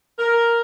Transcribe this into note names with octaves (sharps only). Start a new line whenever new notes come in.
A#4